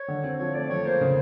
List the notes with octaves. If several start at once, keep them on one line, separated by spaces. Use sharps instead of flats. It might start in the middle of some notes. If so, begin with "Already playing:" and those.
Already playing: C#5
D3
C4
F3 C#5
A3 D5
F2 C#5
A#3 C5
C#3